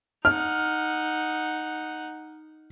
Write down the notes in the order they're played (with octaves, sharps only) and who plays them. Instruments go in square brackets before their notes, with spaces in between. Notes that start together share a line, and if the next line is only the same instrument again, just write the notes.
[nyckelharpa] D#4 F#5 [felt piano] F6